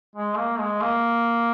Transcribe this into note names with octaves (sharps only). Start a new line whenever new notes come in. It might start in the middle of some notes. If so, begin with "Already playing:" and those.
G#3
A#3
G#3
A#3